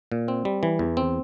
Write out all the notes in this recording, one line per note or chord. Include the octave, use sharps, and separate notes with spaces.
A#2
C4
G3
E3
E2
C4